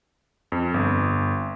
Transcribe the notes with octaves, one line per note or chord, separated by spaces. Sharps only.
F2
G1